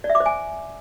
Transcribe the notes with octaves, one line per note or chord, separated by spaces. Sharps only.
D5
E5
D6
C5
G#5